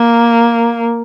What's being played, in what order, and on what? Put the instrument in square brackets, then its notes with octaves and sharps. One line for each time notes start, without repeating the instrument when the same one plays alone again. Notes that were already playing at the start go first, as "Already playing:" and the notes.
Already playing: [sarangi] A#3